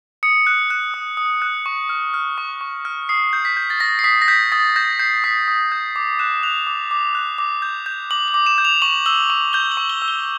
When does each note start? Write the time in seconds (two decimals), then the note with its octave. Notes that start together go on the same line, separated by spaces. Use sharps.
0.23 D#6 C#7
0.47 F#6
0.70 F#6
0.94 D#6
1.17 D#6
1.42 F#6
1.66 C#6
1.89 F6
2.14 F6
2.38 C#6
2.61 C#6
2.85 F6
3.09 D#6 C7
3.33 G6
3.45 B6
3.57 G6
3.70 A6
3.80 D#6 A#6
3.99 C7
4.04 D#6 B6
4.22 A#6
4.28 G6 B6
4.52 D#6 A6
4.76 G6 A#6
4.99 G6 C7
5.24 D#6 B6
5.48 D#6
5.72 G6
5.96 D6
6.19 F#6 E7
6.43 F#6 F7
6.67 D6
6.91 D6
7.15 F#6
7.38 D6
7.62 G6
7.86 G6
8.11 D6 F#7
8.28 F#7
8.34 D6
8.46 E7
8.58 G6
8.65 F7
8.82 C#6 F#7
9.06 E6 F#7
9.30 C#6 F#7
9.53 G6 G7
9.72 F#7
9.77 C#6
9.90 G7
10.02 E6
10.08 G7